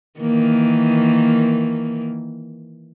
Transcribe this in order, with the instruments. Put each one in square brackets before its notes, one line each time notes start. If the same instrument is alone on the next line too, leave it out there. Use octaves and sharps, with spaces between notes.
[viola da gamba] D#3 E3 A#3